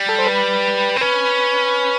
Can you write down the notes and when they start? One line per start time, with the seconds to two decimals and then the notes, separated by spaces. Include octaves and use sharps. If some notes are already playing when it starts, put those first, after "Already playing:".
Already playing: G3
0.09 A4
0.19 C5
0.27 B4
0.96 C4
1.01 C#4 B4